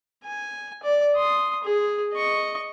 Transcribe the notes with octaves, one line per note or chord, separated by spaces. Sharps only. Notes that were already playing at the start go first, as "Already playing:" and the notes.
G#5
D5
C6 D#6
G#4
D#5 C#6